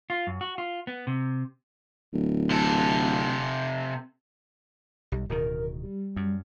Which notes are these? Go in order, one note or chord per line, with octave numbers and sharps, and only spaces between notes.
F4
F#2
F#4
F4
B3
C3
D1
C3 A4
B1 G3
D1 B2 D#3 A#4
G3
F#2